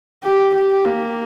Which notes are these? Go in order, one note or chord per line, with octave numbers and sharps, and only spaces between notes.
G4
G4
A#3